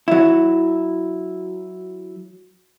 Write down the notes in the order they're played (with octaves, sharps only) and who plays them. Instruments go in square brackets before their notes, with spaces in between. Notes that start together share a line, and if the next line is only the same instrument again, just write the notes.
[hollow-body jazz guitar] F#3 E4